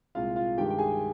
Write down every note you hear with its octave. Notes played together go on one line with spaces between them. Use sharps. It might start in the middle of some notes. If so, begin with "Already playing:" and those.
C2 A#2 G#3 F4 F5
F4 F5
G2 D#3 G#3 G4 G5
G5
G#4 G#5